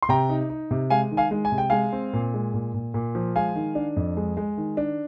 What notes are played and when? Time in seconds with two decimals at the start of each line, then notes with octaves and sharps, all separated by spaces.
0.02 C6
0.09 C3 G5 A#5
0.29 D#4
0.50 D#4
0.71 C3
0.90 G#3 F5 G#5
1.11 D#3
1.17 F5 G#5
1.31 G#3
1.45 G#5
1.52 C3
1.58 G5
1.70 G#3 F5 G#5
1.93 C4
2.13 A#2
2.34 G#3
2.54 A#2
2.74 A#2
2.94 A#2
3.15 F3
3.36 G#3 F5 G#5
3.55 D#3
3.75 D4
3.96 F2
4.17 G#3
4.37 G#3
4.57 D#3
4.77 D4